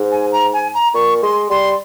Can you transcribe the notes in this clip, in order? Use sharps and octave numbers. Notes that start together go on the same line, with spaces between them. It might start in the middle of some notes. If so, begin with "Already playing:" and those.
Already playing: G#2
G#5
A#5
G#5
A#5
A#2 C#6
G#3 C6
G3 C6